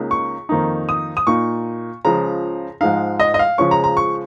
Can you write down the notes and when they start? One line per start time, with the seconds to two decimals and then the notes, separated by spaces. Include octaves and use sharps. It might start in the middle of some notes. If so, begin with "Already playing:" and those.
Already playing: C#2 C#3 A#3 D#4
0.11 C#6
0.49 F2 D#3 A#3 D#4
0.89 D#6
1.17 D#6
1.27 A#2 A#3 D#4 C#6
2.05 C#2 C#3 F3 A#5
2.81 G#2 F3 G#3 D#4 F5
3.20 D#5
3.34 D#5
3.39 F5
3.58 C#2 C#3 F3 G#3 C#4 C#6
3.71 A#5
3.84 A#5
3.97 C#6